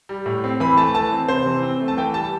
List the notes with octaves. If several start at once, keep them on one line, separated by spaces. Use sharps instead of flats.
G3
A2
C4
E3 B5
A3 A5
E3 A5
C4
C3 C5
E3
C4
A3
A5
E3 G5
G3 A5